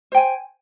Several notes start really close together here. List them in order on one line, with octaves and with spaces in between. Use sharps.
C5 G5 G#5